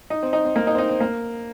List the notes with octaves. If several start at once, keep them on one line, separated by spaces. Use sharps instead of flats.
D#4
C4
D#4
C4
A#3
D#4
C4
D#4
C4
A#3